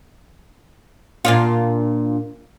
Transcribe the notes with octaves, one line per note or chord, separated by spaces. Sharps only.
A#2 D4 F4